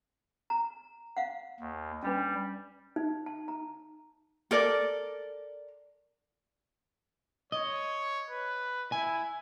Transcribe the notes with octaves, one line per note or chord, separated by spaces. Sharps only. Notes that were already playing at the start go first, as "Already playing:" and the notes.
A#5
F5 F#5
D#2
G3 C#4 D4 B4
D#4
A5
A#5
A4 A#4 D5
C#5 D#5
B4
E4 G#5